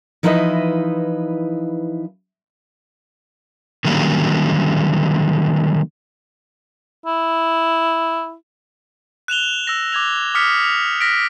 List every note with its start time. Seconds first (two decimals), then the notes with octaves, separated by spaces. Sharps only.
0.23 E3 F3 D#4 E4 B4 D#5
3.85 D3 D#3 F#3 G3 A#3 C#4
7.06 E4
9.28 F#6 E7 F7 G7
9.67 E6 A#6
9.92 D6 G#6 F7
10.35 D6 D#6 F6 B6 C#7
10.64 F7
11.00 F6 A#6 B6 D7